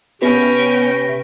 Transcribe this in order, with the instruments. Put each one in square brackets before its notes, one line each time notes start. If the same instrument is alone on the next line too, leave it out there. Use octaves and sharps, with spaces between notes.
[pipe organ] C3 E5 A#6 [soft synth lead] B3 [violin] C#4 G5 [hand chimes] G4 B4